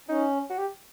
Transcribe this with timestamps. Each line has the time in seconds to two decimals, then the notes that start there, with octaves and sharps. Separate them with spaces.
0.08 C#4 D#4
0.50 F#4
0.58 G4